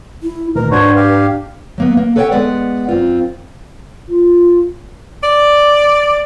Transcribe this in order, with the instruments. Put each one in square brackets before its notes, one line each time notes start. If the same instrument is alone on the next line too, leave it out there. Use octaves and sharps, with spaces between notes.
[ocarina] E4
[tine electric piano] D2 A#2 D#3 [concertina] A#4 [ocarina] B4
[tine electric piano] G#2 D4 G#6 [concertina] F#4 C5 C#5
[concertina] G4 F5
[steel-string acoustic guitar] F#3 A#3 B3
A#3
A4 B4 C#5 D5 F#5 G5
G#3 B3 B4 D5 F#5
F#2 C4 F4
[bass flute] F4
[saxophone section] D5